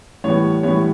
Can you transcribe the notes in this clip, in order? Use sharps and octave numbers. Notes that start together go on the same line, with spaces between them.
A2 E3 G3 B3 C#5
A2 E3 G3 B3 C#5